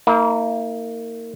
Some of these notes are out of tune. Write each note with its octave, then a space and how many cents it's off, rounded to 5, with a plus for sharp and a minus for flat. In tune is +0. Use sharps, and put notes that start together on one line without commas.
A#3 -25 D#4 +45